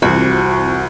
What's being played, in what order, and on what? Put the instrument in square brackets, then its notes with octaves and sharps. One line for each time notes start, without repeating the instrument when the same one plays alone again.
[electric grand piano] C2 [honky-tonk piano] F2 E3 [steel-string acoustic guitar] F#4